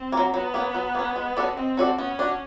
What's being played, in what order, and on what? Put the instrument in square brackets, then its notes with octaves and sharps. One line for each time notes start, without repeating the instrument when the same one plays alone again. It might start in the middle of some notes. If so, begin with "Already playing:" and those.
Already playing: [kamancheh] C4
[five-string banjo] F#3 A#3
[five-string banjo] F#3 [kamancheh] B3
[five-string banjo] A#3 C#4
F#3
A#3 C#4
G#3
C#4 F#4 A4 D5
[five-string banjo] G#3 [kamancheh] C4
[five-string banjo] C#4 F#4 A4 D5
[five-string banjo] B3 [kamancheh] C#4
[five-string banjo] D4 F#4